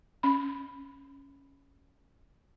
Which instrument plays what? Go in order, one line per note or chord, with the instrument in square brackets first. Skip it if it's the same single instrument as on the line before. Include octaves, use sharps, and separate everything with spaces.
[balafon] C#4 B5